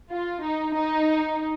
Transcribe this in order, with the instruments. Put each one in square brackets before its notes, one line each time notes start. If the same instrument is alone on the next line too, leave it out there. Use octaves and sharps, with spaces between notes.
[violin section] F4
D#4
D#4